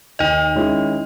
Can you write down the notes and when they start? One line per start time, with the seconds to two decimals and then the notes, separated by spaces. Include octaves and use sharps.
0.19 D#2 D#4 D#5
0.55 D#3 G#3 C#4 E4